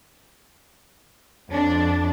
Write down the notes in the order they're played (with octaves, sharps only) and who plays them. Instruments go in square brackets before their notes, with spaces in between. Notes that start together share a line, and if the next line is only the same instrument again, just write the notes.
[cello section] F2 D4